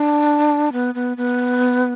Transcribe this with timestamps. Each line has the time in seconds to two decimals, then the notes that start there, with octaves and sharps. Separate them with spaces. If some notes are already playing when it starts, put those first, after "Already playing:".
Already playing: D4
0.72 B3
0.95 B3
1.17 B3